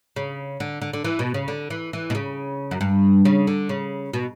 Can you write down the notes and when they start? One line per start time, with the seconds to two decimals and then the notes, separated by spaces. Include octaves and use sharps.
0.16 C#3
0.60 D3
0.82 D3
0.93 D3
1.04 E3
1.19 B2
1.34 C#3
1.48 D3
1.70 E3
1.93 E3
2.10 B2
2.15 C#3
2.71 F#2
2.81 G2
3.25 C#3
3.47 D3
3.69 C#3
4.13 B2